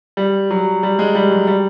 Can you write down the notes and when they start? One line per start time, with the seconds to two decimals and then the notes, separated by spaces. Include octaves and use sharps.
0.17 G3
0.51 F#3
0.83 G3
0.99 G#3
1.15 G3
1.31 F#3
1.47 G3